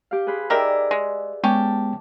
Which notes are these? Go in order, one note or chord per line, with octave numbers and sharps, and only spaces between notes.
G4 F5
G#4 B4 C5
D#3 G4 G#4 A#4 D5 E5
G#3
G#3 B3 C#4 G4 A5